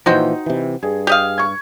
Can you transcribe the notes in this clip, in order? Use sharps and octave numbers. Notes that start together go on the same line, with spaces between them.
A#2 E3 F3 D#4 F#4 C5 G5
C3 E3
G2 G#4
G4 D#5 F5
C#6 G#6